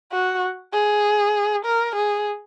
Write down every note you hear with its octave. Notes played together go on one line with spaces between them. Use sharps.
F#4
G#4
A#4
G#4